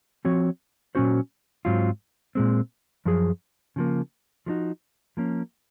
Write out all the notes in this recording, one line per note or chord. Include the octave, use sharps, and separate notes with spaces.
F3 C4 F#4 C#5
A#2 F#3 C#4 F#4 C5
G#2 F#3 C4 F4
A#2 G#3 C4
F#2 F3 G#4
C#3 F3 A#3
F3 G#3 D#4 F#4
F3 A#3 C#4